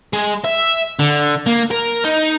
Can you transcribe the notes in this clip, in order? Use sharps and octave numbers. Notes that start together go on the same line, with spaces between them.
G#3
E5
D3
A#3
A#4
D#4